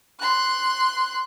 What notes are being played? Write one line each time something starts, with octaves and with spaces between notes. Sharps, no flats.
C6 F#6